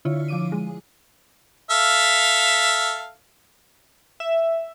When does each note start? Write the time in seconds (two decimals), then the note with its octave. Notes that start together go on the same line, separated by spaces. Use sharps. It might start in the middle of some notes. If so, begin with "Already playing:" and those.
0.05 D3 E4 F4 C#5
0.28 F3 D6 D#7
0.52 G#3
1.71 A4 E5 F5
4.20 E5